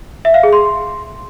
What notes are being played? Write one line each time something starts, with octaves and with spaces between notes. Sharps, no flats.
E5
F5
G#4
C6